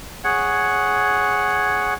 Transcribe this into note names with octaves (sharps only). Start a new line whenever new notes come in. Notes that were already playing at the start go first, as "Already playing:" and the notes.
G#4 C#5 F#5